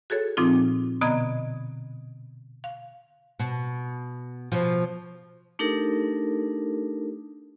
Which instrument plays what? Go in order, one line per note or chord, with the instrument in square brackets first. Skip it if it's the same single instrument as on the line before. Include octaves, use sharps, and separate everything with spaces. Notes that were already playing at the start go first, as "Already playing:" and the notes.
[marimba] F#4 G#4 A4 C#5
A#2 F3 C4 D#4 F4
B2 D3 B3 D#5 A#5 G#6
F5
[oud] B2
B2 F3
[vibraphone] A3 D4 D#4 G4 A4 A#4